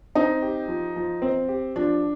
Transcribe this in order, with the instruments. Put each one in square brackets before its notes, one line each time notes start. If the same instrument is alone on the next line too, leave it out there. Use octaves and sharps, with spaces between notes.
[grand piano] C4 [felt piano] D#4
[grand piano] G4
F3
F3
C4
G4
[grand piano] F3 [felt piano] D4